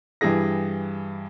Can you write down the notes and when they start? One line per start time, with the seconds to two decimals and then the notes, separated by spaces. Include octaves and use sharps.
0.21 G2 E3 G4 G#4 A#6